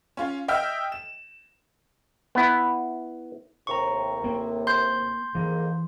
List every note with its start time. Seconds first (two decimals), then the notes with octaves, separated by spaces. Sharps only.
0.17 C#4 F4
0.48 D#5 E5 G5 E6 F6
0.92 E7
2.35 B3 E4
3.67 D#2 A2 C3 A#5 C#6
4.24 A#3
4.67 C6 G6
5.35 F2 G#2 E3 A#3